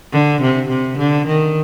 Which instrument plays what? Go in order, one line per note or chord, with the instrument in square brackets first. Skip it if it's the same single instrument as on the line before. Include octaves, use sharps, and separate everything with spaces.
[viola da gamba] D3
C3
C3
D3
D#3